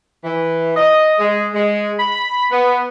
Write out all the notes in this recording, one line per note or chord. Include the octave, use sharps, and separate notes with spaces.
E3
D#5
G#3
G#3
B5
B3